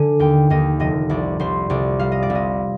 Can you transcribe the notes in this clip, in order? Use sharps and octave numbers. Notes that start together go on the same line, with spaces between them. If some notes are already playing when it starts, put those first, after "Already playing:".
Already playing: D3 G#5
D#2 G5
D#2 D#5
F1 D#5
C2 D5
C2 C5
C2 D5
G3 F5
D#5
D5
C2
D#5